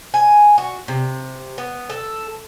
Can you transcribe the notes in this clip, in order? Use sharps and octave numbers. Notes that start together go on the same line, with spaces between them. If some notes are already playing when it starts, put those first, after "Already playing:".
G#5
F#4
C3
B3
A4